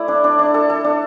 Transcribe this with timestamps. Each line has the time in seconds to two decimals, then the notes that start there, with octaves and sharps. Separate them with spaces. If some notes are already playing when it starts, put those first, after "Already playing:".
Already playing: A3 E4 D5
0.08 D4
0.24 D4
0.39 D4
0.54 A4
0.70 A4
0.84 D4